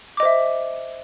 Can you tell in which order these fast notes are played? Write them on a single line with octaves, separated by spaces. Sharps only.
D6 D#5 C5 E5